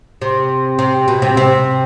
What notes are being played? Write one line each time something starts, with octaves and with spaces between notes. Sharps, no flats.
C3
C3
B2
C3
C3